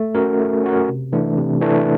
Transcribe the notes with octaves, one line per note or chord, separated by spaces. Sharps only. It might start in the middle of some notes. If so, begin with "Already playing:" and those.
Already playing: A3
C#4 F#4 A#4
A3
C#4 F#4 A#4
C3
E3 A3 D4
C3
E3 A3 D4